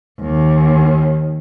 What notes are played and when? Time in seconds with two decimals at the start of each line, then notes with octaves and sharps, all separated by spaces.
0.22 D#2